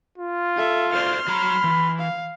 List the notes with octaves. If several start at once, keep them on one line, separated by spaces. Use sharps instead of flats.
F4
A4 E5
A4 C5 D5 C6 F6
F#3 A#5 B5
E3
F5